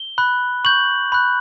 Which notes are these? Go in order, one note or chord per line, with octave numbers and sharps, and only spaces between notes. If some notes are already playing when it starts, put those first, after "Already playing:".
Already playing: G7
B5 F#6
C#6 G6 F#7
B5 F#6